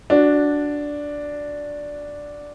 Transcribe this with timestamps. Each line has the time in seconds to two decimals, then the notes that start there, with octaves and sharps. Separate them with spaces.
0.10 D4 F#4